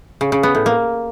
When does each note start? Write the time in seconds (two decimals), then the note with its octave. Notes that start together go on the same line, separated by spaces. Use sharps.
0.21 C#3
0.32 C#3
0.43 B3
0.55 A2
0.66 A#3